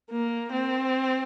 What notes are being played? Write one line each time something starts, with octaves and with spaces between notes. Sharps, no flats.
A#3
C4